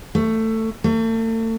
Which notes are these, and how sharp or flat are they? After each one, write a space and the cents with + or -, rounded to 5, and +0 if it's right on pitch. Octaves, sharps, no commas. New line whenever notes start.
A3 +15
A3 +40